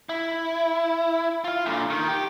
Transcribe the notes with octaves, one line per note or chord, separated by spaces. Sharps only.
E4
F4 F5
A#2 D3
D#3
G4